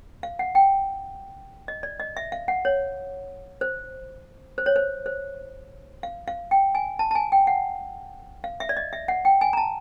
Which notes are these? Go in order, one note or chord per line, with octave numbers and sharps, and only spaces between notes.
F5
F#5
G5
D#5
D5
D#5
E5
F5
F#5
C#5
C5
C5
C#5
C5
C5
F5
F5
G5
G#5
A5
A5
G#5
G5
F#5
F5
E5
D5
D#5
E5
F#5
G5
G#5
A#5
A5